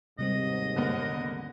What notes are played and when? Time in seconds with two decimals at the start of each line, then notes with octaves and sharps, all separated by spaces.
0.19 D#2 G#2 C3 G3 C4 D#5
0.76 D3 A#3 B3